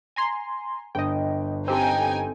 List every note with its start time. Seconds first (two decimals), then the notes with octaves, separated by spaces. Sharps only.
0.16 G#5 A#5 C6
0.95 G1 D#5 G5
1.68 C4 D#4 G4 A4 G5 G#5